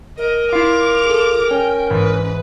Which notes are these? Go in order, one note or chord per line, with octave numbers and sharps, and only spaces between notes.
A#4 D#5
E4 F4 D6 C7 F7
G#4 A4
C#4 G5
G#2 E3 B4